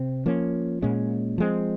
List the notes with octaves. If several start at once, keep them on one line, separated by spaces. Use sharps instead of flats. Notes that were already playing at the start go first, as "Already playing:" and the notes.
Already playing: C3 C4
F3 A#3 C#4
A#2 G#3 C#4
F3 G#3 C4